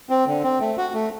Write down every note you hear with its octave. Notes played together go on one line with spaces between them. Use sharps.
C4
D3
C4
A3
F#4
A3